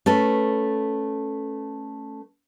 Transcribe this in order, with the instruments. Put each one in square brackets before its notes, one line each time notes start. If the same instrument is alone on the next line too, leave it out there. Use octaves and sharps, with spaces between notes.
[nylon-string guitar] A3 C#4 A4 B4